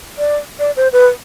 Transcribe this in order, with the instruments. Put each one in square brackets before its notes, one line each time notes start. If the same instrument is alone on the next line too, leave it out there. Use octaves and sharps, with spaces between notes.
[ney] D5
D5
C5
B4